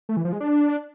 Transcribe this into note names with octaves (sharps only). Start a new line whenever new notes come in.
A3
E3
F3
G#3
D4